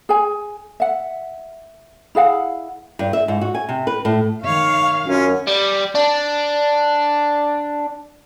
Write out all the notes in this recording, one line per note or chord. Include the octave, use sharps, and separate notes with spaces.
G#4 G#5
E5 F#5
E4 G#4 F5 F#5
G2
E5
G#2
F#4
G#5
C3
B4
A2
D#3 C#5 F5
F#2 C#4 F4
G3
D4